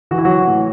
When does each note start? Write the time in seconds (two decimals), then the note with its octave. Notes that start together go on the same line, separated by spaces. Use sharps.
0.11 E3 F#4
0.18 E4
0.25 F#3 F#4
0.47 A2